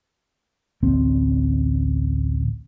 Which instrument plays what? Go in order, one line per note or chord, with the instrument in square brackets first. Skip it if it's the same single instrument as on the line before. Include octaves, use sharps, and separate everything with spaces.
[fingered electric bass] A1 D2 C4